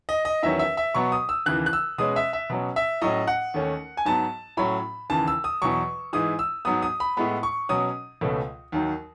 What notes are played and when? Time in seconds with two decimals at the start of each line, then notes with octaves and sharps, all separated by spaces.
0.09 D#5
0.25 D#5
0.43 E2 D#3 F#3 C#4 E5
0.59 E5
0.77 E5
0.95 B2 F#3 B3 C#6
1.12 D#6
1.29 E6
1.46 D#2 C#3 E3 F#6
1.66 F#6
1.73 E6
1.98 B2 G#3 C#4 D#6
2.16 E5
2.33 E5
2.50 B2 F#3 C#4
2.76 E5
3.02 A2 F#3 C#4 D#5
3.27 F#5
3.54 D#2 D#3 A3 C#4
3.97 G#5
4.05 G#2 F#3 B3 A5
4.57 A2 F#3 C#4 B5
5.10 D#2 C#3 E3 A5
5.28 E6
5.44 D#6
5.62 E2 B2 F#3 C#6
6.13 G#2 E3 G#3 D#6
6.39 E6
6.65 G#2 F#3 B3 D#6
6.82 D#6
7.00 B5
7.17 A2 G#3 B3 B5
7.43 C#6
7.69 B2 F#3 C#4 D#6
8.21 C#2 B2 A3 C#4
8.72 D#2 D#3 F#3